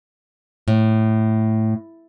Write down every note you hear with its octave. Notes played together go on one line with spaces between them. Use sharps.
A2